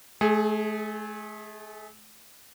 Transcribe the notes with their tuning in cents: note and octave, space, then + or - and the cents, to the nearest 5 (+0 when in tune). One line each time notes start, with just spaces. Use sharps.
A3 -40 G#4 +0